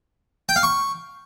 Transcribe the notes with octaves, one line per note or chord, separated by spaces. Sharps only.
G5
F5
C#6